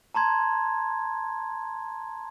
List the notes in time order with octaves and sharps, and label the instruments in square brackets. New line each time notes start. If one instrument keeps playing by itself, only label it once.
[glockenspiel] A5 A#5 C6 G#6